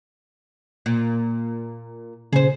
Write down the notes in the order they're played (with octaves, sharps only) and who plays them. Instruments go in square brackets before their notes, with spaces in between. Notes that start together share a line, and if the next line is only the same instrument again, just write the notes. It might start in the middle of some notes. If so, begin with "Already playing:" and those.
[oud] A#2
[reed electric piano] A#2 C#3 [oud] G#4 C5